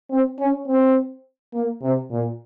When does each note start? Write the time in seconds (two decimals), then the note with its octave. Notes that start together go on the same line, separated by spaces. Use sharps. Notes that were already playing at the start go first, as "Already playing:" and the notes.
0.10 C4
0.39 C#4
0.67 C4
1.54 A#3
1.82 C3
2.10 A#2